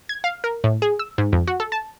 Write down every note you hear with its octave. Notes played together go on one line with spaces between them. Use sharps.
G#6
F5
A#4
A2
G#4
E6
G#2
F2
F#4
A4
A5